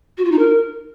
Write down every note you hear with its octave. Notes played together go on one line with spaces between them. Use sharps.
F#4
F4
D#4
A#4